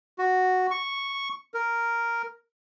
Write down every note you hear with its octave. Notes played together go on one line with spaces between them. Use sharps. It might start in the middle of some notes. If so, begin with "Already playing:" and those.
F#4
C#6
A#4